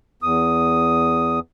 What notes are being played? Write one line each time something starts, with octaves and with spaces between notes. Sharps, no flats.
E2 D#6